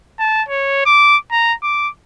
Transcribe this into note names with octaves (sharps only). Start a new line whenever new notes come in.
A5
C#5
D6
A#5
D6